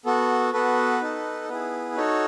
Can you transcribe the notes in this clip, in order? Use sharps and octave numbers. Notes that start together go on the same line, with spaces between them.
B3 F#4 A4
B3 F#4 A4 B4
D#4 A4
B3 E4 G#4 B4
D#4 F#4 A4 C#5